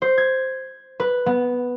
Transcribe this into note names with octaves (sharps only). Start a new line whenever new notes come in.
C5
G#6
B4
B3